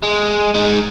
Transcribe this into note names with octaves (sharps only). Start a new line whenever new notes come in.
G#3
G#3 D#4